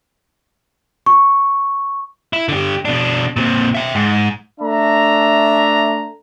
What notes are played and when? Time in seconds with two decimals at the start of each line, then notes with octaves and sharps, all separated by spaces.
1.06 C#6
2.33 E4
2.49 D3 G4
2.85 B2 D4
3.37 A#2 C4
3.75 E5 G5
3.95 G#2
4.60 A3 D4 E5 A#5